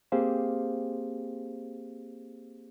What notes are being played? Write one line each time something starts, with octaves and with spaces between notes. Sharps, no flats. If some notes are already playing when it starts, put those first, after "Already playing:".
A#3 C4 G4 G#4 C5 F5